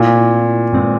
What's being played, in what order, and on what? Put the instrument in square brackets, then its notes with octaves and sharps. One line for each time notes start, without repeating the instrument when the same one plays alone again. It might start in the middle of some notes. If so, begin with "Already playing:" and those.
Already playing: [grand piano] A#2 [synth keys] A3 C4 E4
[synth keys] G2 D#3 G#3 C4